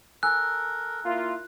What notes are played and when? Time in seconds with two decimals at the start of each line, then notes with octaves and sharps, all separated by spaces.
0.23 A4 A#4 G#5 E6 F#6
1.05 A#3 E4 F4